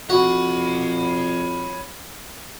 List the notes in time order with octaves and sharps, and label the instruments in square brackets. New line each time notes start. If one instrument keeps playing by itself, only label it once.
[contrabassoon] F2 [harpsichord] F#4 [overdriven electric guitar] C#5 B5